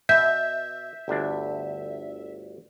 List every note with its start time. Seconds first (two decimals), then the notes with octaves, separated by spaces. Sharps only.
0.09 B2 E5 G6
1.08 G1 D2 D4